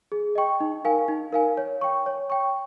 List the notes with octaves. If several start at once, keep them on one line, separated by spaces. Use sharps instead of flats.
G#4
D#5 G5 C#6
D#4
A#4 F5 G#5
D#4
A#4 F5 G#5
C#5
G5 C#6
C#5
G5 C#6